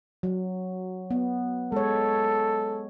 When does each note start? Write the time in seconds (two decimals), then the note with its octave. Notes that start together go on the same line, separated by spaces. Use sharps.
0.23 F#3
1.11 B3
1.72 G#3 A4 C#5